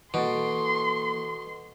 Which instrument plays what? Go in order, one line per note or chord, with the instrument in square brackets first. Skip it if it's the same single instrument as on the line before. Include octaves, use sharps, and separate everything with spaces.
[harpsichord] B2 [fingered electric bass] E3 [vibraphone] A#3 A4 [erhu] C6